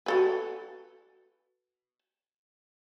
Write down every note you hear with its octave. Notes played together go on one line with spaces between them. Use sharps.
F#4 A4 B4